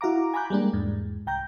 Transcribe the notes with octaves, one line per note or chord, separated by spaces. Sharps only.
E4 F#4 F5 A#5 D6
G#5 A#5 B5 D6 F#6 G6
G3 G#3 A#3 D4
E2 G#2
C2 G5 A#5 G6